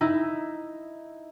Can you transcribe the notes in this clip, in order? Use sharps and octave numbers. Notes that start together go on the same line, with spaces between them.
D#4 E4